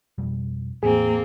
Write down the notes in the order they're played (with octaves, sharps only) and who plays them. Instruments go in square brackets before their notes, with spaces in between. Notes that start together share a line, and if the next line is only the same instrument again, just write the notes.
[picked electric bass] F2 B2 G3
[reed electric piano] E2 G#4 [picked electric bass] A2 [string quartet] A#3 C4